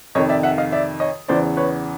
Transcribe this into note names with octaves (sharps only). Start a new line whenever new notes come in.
F2 C3 D#3 C#5 D#5
D5 E5
E5 F#5
D#5 F5
D5 E5
C#5 D#5
E2 C#3 E3 C5 D5
B4 C#5